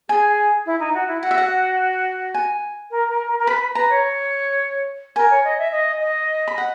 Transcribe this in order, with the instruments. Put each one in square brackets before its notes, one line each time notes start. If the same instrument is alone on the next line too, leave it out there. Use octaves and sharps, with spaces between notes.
[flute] G#4 [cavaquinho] G#5
[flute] E4
D#4
F#4
E4
[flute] F#4 [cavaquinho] F#5
[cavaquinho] E5
F#5
G#5
[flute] A#4
A#4
A#4
A#4
[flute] B4 [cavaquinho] B5
[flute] B4 [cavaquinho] A#5
[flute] C#5
[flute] A#4 [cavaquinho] G#5
[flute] C#5
D#5
E5
D#5
D#5
[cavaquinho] B5
F#5